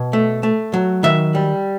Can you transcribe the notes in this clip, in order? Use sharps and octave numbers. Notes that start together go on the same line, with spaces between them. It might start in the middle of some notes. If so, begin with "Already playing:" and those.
Already playing: B2
A3
A3
F#3
D#3 E5
G3